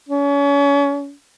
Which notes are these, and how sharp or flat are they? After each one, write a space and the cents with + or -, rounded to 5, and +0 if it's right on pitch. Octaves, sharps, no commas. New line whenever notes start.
C#4 +35